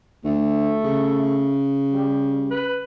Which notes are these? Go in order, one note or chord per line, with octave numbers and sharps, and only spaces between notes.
D2 A3
C#3
G3
B4